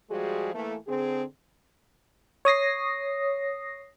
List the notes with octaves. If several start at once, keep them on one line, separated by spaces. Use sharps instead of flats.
F3 G3 G#3 F#4 G#4
E3 A3 A#3
D3 C4 G#4
C#5 D#6 A#6 C7